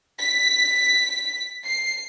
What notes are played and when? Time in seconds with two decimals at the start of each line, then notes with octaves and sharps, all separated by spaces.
0.19 B6
1.65 C7